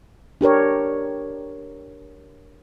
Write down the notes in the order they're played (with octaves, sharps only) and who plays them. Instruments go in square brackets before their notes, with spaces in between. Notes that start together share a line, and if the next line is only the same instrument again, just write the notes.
[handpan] D4 G4 A#4 C#5